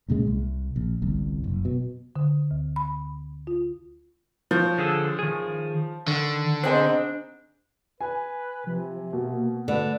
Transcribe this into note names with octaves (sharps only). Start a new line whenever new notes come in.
C#2 A#2 C#3 G#3
C2
A#1
G1 C2
F#1
B2
D3
D2
B5
F4
F3 C#5 G6
D3 G#4 A4
D#3 G#4
D3 D#3
B2 B3 C4 D4 D#4 G#4 C5
B4 G#5
C3 F3
B2 A#3
D3 A3 B4